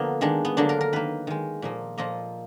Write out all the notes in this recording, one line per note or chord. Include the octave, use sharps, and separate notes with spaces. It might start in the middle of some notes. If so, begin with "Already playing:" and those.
Already playing: D3 F3 A#3 B3
D#3 G#3 D4
B3
D3 F#3 A#3 D4
A#4
A#4
D#3 A#3 B4
D#3 G#3
A#2 F3 A#3
A#2 F3 A#3 D#5